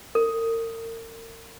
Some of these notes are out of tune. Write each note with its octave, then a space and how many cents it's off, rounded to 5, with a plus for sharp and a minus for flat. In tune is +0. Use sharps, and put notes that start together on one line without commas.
A#4 -40